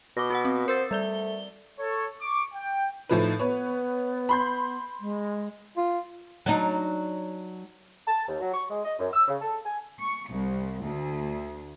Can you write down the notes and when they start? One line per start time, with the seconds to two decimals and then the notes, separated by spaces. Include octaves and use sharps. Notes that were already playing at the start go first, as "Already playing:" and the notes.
0.17 B2 D6 A#6
0.30 F#4 B4 F#5
0.45 C4
0.68 A#4 C5 E6 A6
0.91 G3 A3 D5 G7
1.79 A4 C#5
2.21 C#6 D6
2.53 G5
3.09 A2 F3 D#4 B4
3.40 B3 B4 C#5
4.29 B5 C6 G6
5.00 G#3
5.77 F4
6.46 F#3 D4 D#4
8.07 A5
8.28 D#2
8.41 F#3
8.54 C#6
8.69 G#3
8.85 D#5
9.00 F#2
9.13 E6
9.28 C#3
9.41 A4
9.66 G#5
10.00 C#6
10.32 C2
10.84 D2